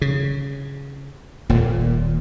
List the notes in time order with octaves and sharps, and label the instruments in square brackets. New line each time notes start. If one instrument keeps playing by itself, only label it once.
[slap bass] C#3
[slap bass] D#1 [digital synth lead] A#2